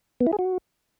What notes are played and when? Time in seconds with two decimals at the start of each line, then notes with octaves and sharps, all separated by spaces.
0.21 B3
0.27 E4
0.33 G#4
0.39 F#4